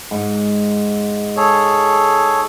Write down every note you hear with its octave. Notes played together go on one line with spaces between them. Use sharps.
G#2
G#4 A4 C#5